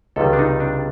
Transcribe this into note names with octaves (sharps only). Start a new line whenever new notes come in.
C#2 C3 D#3 G3 A4
D4
D#4
D4